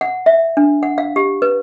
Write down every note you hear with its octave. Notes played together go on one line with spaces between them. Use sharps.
F#5
E5
D4
F#5
F5
G4
B4